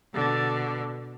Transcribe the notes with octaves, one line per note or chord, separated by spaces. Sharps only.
B2 D3